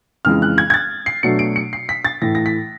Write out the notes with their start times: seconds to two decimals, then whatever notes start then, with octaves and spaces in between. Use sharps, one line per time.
0.25 F2 C#3 E3 G#3 F6
0.42 F#6
0.58 G#6
0.70 G#6
0.74 A6
1.06 C7
1.23 B2 F#3 A3 D4 C#7
1.39 D7
1.56 C#7
1.73 C7
1.89 B6
2.05 A6
2.22 A2 E3 A3 A#6
2.35 A#6
2.46 B6